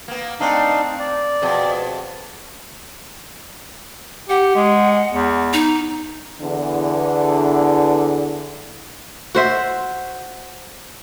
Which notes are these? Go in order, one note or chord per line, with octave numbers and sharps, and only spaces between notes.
A#3 B3
A3 C4 D4 D#4 F5
D5
F2 B2 G#4
G4 F#5
G#3
E2
D#4
E2 D3
F#4 C5 E5